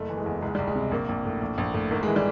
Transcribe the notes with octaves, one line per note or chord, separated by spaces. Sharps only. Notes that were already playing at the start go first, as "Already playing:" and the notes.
Already playing: F#1 A3
E3
G#3
E2
C#2 G#3
C#2 G3
G#3
C3
A#1 A#3
A#1
A2
A#1
A#1
A2
G#1 A#3
E3 G#3
G3